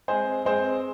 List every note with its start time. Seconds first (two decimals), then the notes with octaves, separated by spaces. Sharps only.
0.08 G#3 C4 G#4 C5
0.45 G#3 C4 G#4 C5